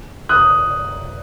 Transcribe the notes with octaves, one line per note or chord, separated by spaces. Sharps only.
D#6 F#6